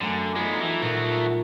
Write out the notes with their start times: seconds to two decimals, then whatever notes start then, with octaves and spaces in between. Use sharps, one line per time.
0.01 F#2 D3 A3 G#5
0.36 G#3 B3 D#4 F4 A4
0.61 E3
0.82 D#1 A#2 A3 F4 F#4